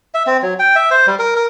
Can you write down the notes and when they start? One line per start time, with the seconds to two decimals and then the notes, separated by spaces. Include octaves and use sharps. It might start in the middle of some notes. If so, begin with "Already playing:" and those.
0.14 E5
0.27 C4
0.42 F#3
0.59 G5
0.76 E5
0.91 C5
1.07 G3
1.19 A#4
1.36 A#4